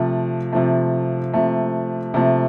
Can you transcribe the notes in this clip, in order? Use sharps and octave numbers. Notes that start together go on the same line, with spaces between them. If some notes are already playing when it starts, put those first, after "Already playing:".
Already playing: C3 F3 A3
C3 F3 A3
C3 F3 A3
C3 F3 A3